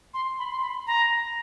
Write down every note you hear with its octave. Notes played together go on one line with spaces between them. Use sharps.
C6
B5
C6
B5
A#5